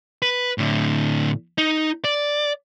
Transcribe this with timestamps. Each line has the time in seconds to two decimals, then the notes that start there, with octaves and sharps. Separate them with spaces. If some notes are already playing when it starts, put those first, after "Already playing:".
0.22 B4
0.58 A2 D3
1.58 D#4
2.04 D5